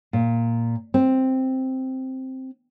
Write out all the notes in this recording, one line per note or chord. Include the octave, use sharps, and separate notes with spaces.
A#2
C4